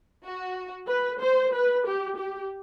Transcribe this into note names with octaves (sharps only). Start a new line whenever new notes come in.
F#4
B4
C5
B4
G4
G4